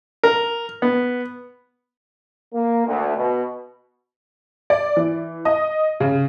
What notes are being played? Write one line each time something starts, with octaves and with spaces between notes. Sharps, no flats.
A#4
B3
A#3
D2
B2
D5
E3
D#5
C#3